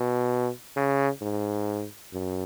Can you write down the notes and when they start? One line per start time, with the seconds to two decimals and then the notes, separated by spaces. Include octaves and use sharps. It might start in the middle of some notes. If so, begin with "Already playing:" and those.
Already playing: B2
0.77 C#3
1.22 G#2
2.13 F#2